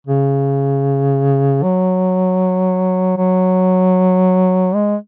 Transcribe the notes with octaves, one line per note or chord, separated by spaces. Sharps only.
C#3
F#3
F#3
G#3